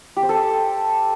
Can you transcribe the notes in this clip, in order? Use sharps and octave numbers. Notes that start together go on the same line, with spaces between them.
G4
C5
A4